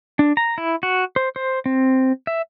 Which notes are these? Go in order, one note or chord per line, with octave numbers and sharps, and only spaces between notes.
D4
A#5
E4
F#4
C5
C5
C4
E5